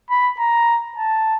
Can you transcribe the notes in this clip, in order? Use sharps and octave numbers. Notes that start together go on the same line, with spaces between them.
B5
A#5
A5